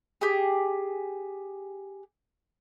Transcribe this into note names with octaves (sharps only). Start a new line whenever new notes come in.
G4 G#4